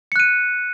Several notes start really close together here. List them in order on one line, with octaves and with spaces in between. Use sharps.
C#7 F#6 D#7